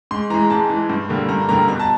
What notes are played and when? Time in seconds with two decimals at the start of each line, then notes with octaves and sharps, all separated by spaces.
0.11 G#2 C6
0.30 E3 G#3 A#5
0.50 G#2 A5
0.70 E3 G#3
0.89 G2
1.09 D3 G3 A#3
1.29 G2 A#5
1.49 D3 G3 A#3 A#5
1.68 B2 A#5
1.80 A5